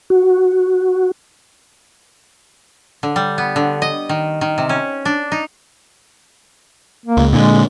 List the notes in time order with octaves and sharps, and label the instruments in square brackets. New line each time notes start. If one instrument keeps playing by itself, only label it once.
[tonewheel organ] F#4
[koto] D3
G3
B3
D3
D#5
D#3
D#3
C3
C#4
D4
D#4
[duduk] A#3
[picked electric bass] C#2
[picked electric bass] A#2 D3 [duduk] G#3